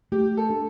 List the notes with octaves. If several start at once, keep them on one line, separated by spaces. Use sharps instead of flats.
A3 G4
A4
D4